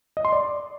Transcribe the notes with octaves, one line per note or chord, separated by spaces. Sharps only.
D#5
C6
D5